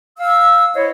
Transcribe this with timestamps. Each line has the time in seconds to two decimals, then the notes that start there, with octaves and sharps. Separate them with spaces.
0.18 F5 E6
0.75 E4 C5 C#5 D#5